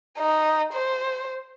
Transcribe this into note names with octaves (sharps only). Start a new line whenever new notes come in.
D#4
C5